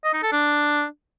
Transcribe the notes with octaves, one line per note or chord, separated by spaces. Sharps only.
D#5
D#4
A4
D4